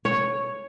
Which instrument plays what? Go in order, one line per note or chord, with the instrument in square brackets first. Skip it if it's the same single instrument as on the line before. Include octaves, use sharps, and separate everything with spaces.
[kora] C#5